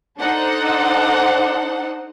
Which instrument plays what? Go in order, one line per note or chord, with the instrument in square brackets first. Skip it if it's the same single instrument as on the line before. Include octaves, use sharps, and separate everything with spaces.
[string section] D4 D#4 A4 C5 F#5